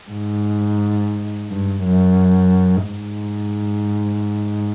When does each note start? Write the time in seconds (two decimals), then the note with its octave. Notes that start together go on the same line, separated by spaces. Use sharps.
0.10 G#2
1.49 G2
1.84 F#2
2.89 G#2